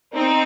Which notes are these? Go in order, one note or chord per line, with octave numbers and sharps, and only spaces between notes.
C4 D#4